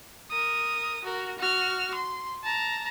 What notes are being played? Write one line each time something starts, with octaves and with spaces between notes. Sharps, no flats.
A#4 D#6
F#4 A#4
F#4 F6
C6
A5 A#5